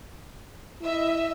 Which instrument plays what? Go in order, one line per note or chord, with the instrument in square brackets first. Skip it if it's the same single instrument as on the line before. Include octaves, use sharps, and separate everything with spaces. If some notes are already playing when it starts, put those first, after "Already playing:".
[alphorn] E4 [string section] D#5 E5 E6